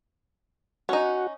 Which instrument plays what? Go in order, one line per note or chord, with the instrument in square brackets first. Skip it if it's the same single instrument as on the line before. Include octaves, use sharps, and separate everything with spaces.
[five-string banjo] C#4 D#4 [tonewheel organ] F#4